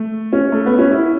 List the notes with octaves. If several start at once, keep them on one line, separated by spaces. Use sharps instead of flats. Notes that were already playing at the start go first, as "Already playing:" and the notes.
Already playing: A3
C#4
A3
B3
C#4
E4